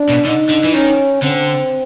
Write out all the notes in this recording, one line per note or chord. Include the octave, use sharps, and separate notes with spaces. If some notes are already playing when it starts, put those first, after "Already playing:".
Already playing: D4
B2
D3 D#4
D3
E3
D#3 C#4
D3 C4